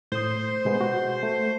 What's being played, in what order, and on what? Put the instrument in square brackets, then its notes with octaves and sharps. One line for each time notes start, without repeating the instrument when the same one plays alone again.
[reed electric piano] A2 D#6 [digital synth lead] C5
[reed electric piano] B2 G#3 B3
F#4
A3